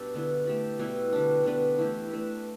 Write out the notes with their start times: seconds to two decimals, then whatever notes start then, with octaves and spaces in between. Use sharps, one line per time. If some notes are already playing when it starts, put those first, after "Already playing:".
Already playing: B2 G3 D4 G4 A4
0.14 D3 B3 E4
0.46 A3 G4 D5
0.79 B2 G3 E4
1.13 D3 G3 D4
1.44 D3 B3 D4 B4
1.78 E3 A3 E4 G4
2.11 A3 D4 B4